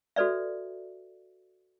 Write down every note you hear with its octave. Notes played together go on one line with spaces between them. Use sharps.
F#4 A4 B4 D5 E5